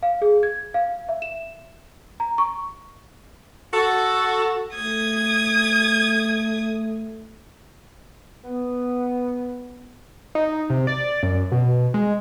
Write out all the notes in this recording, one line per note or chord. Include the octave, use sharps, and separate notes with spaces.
F5
G#4
G#6
F5
E5
E7
A#5
C#6
F#4 A4
A3 D#6 G#6
B3
D#4
C3
D5
F#2
B2
G#3